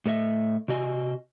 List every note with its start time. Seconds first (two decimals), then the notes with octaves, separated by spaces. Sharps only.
0.06 A2 A4 D#5 E5
0.68 C3 F#4 D#5 G#5